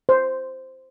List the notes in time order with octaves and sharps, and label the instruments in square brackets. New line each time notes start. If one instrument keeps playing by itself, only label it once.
[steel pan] C5